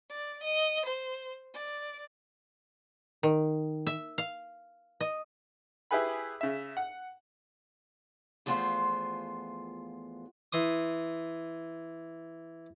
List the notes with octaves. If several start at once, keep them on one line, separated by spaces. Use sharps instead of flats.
D5
D#5
C5
D5
D#3
E5
F5
D#5
E4 G4 G#4 B4 G#5 B5
C#3 E5
F#5
E2 F3 A3 B3 F4 C5
E3 C6 D#6